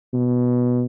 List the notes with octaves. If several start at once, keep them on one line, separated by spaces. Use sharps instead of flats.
B2